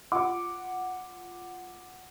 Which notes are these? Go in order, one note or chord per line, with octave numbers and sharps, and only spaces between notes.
F4 F#5 D6